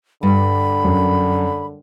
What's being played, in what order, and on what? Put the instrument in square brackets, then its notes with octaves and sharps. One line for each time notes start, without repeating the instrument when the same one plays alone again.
[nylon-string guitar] G2 [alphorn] D3 [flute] B5
[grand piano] F#2